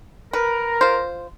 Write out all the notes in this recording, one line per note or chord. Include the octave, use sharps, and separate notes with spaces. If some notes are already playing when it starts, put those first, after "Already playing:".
A#4 B4
F4 C5